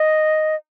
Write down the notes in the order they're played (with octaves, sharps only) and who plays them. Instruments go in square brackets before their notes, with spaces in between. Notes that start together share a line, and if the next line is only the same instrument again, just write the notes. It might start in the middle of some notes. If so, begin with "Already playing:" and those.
Already playing: [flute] D#5